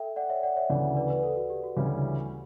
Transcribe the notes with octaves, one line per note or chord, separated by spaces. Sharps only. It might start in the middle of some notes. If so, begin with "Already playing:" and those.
Already playing: A4 E5 G5
D5 F#5
C#5 E5
D5 F#5
C#5 E5
D2 C#3 E3 D5 F#5
B4 D5
B4
A4
F#4
G4
F#4
D2 C#3 E3 G3 C#4